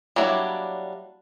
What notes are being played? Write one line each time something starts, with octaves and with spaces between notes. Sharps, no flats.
F#3 G3 A#3 D4 E4